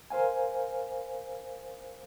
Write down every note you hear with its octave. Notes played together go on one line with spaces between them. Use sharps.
A#4 C5 F5 G#5